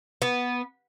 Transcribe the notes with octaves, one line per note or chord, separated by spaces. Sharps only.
B3